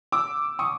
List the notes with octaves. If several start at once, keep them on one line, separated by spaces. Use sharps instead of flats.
D6 E6
C#6 D#6